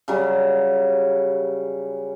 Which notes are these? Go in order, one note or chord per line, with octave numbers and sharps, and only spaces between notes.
C#3 F#3 G3